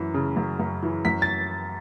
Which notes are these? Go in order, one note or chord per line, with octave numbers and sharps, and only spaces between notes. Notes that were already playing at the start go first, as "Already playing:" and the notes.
Already playing: F#2 E3
C#3
F#2
F#2
E3
F#2 B6
A6